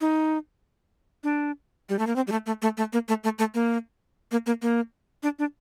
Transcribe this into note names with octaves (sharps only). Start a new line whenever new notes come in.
D#4
D4
G3
A3
A#3
C4
G3
A3
A3
A3
A3
A#3
A3
A3
A3
A#3
A#3
A#3
A#3
D4
D4